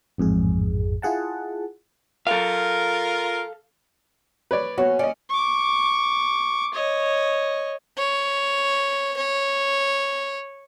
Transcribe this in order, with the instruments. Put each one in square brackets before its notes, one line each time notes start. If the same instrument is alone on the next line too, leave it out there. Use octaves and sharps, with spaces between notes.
[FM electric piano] A1 F2 G#2 G#4
E4 F4 G#4 F#5 A5
[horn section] F4 A#4 [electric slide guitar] A4 F5
[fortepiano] B4 C#5 D5
[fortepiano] B3 F#4 [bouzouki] C#4
[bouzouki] C#4 [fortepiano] D5 D#5
[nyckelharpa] C#6 D6
C#5 D#5
[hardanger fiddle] C#5
C#5